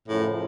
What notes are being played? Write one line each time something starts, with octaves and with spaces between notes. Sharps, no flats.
F#2 A2 C#3 F3